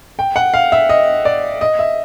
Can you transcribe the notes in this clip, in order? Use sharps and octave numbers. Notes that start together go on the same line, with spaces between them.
G5
F#5
F5
E5
D#5
D5
D#5
E5